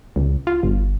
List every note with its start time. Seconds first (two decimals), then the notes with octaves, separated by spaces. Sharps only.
0.16 C#2
0.47 F4
0.63 G1